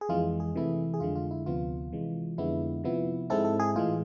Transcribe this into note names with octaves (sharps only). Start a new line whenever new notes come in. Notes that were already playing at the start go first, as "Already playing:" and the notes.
G#4
F2 E3 G#3 F4
G#4
C3 E3 A3 E4
G#4
F2 D3 G#3 F4
F4
E4
D2 C3 F3 B3 F4
C3 E3 G#3
F2 D3 G#3 B3 E4
C3 F3 B3 E4
G#2 G#3 C4 E4 A4
A4
G#4
A2 E3 G#3 F4